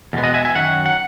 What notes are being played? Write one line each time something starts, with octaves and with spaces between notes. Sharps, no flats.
E2 B2 G#3 B3
D#5 F#5
E5 G#5
E5 G#5
F#2 D#3 F#3 F#5
F#5